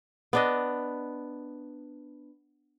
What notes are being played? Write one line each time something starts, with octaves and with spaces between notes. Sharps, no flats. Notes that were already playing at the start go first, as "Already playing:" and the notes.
B3 D4 D#5